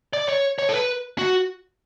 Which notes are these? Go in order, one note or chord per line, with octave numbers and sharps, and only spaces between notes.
D5
C#5
C#5
A4
B4
F#4